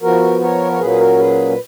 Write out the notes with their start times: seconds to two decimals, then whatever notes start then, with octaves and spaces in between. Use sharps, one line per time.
0.02 F3 B3 F#4 A#4
0.41 A#4 C#5
0.72 C#5
0.79 A#2 F#3 A#3 C#4 G#4 B4
0.90 G#4
0.99 F#4 A#4
1.18 G#4 B4